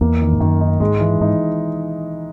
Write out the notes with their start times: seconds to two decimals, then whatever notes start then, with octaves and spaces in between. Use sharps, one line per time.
0.01 E2 A#3
0.21 D#3
0.33 G#2
0.40 F#2 D#3
0.61 D#4
0.80 G#2 G#3
1.00 E3
1.21 G#2 D#4